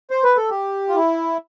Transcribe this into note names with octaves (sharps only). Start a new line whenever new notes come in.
C5
B4
A4
G4
F4
E4